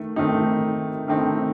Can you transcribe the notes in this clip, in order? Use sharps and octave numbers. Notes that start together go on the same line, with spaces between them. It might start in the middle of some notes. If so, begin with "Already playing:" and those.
Already playing: D#3 A3
D#3 A3 C4 D#4
D#3 A3 C4 D#4